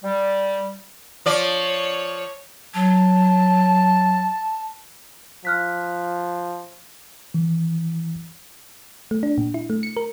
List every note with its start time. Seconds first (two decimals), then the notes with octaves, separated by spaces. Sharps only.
0.04 G3
1.26 F3 C#5 D5
2.74 F#3 A5
5.45 F3 F6 F#6 B6
7.34 E3
9.11 A3
9.23 D4
9.38 A#2
9.54 E4
9.70 A3
9.83 C#7
9.97 A#4